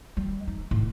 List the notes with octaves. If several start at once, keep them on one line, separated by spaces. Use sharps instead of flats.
G3
D#4
A2